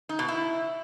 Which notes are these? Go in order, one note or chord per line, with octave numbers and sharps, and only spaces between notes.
D#4
B2
E4